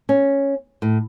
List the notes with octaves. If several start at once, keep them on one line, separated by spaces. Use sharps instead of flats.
C#4
A2